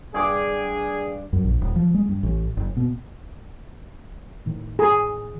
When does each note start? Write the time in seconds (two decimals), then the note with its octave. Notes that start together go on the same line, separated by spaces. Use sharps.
0.14 G2 G#4 D6
1.33 F#2
1.44 A#1
1.61 D#1
1.76 F3
1.94 G#3
2.09 G2
2.23 A1
2.57 F#1
2.77 B2
4.46 A2 D#3
4.79 G#4